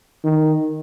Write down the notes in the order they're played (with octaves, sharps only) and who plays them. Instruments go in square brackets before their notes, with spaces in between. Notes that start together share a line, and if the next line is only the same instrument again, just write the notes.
[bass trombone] D#3